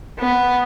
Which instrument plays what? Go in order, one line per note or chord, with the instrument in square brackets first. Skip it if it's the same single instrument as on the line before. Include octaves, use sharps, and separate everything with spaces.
[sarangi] B3